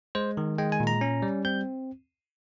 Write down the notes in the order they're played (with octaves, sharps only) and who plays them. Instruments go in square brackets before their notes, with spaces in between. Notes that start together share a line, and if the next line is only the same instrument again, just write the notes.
[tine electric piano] G#3 C5
D#3
G#3 G5
G#5
A#2
A#5
C#4
G3
C4 G6